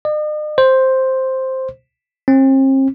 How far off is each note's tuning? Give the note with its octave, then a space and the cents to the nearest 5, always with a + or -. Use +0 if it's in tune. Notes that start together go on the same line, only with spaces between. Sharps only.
D#5 -45
C5 +5
C4 +40